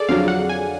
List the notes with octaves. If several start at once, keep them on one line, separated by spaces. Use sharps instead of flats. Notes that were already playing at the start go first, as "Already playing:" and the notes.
Already playing: G#4 A4 D5
F2 D3 F#3 F5
F#5
G#5